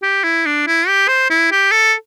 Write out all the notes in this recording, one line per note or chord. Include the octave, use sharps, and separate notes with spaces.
G4
E4
D4
E4
G4
C5
E4
G4
A4